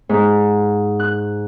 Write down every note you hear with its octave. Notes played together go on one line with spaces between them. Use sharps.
G#2
F#6